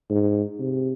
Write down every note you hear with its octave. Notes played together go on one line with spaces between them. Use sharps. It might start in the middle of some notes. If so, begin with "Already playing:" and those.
G#2
C3